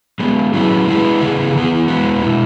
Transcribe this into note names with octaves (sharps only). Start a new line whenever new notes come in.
G#3 B3 G#4
F#3 C#4 E4 G#4 B4
G#3 E4 G#4 B4
C#3 E3 B3 G#4
E3 B3 G#4
G#3 B3 F#4 B4
B2 G#3 E4